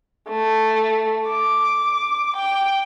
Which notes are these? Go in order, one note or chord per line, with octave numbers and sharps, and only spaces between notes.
A3
D6
G5